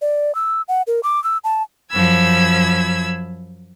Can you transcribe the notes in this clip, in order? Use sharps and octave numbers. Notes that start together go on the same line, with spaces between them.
D5
E6
F#5
A#4
D6
E6
A5
F#2 F3 B5 E6 G#6